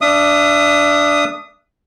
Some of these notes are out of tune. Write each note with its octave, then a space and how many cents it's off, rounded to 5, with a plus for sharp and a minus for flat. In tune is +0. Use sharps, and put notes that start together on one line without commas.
D4 +0 E5 +35 D#6 +0